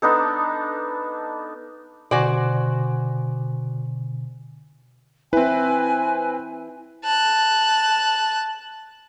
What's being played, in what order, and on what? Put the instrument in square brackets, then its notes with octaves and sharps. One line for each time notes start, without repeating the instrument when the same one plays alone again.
[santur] B3 D4 D#4 A4
[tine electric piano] B2 D3 [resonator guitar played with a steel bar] F#4 D5 [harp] C5 G#5 C#6
[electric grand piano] C4 B4 [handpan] E4 [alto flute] G#5
[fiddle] A5 F#6